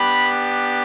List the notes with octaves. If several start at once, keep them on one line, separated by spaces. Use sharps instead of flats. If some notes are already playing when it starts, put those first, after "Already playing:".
Already playing: B3 D4 G4 B5